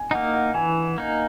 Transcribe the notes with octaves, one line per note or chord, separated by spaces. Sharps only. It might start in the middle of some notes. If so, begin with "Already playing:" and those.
Already playing: G#5
A#3 D#4 F#5
F#5
E3 G#5
A#3 D#4